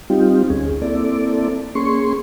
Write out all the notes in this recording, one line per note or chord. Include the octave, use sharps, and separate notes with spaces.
G3 C4 D#4 F4 G4
D2 C#4 G#4
A#3 C4 E4 A4 D5
A#3 C#4 G#4 C6 C#6